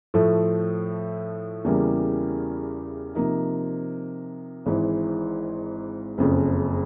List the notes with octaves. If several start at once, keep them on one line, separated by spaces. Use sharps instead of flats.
A2 F3 A3
E2 C#3 E3 G3 A#3
C3 F3 A#3 D#4
G#1 G#2 E3
F#1 F2 C#3